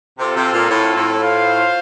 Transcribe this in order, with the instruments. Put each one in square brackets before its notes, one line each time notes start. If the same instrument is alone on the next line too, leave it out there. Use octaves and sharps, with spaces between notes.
[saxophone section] C3 [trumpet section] C4 F4 A4
[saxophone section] C3
A#2
A2
A2
[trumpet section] F4 C5 F5